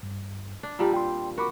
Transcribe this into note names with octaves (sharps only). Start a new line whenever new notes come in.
G2
D4
A#2 G3 C4 G4 A5 A#5
G5 C6
F#4 A#4 B5 D6